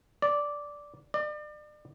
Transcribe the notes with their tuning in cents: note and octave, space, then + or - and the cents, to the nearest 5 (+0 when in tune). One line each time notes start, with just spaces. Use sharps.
D5 -10
D5 +35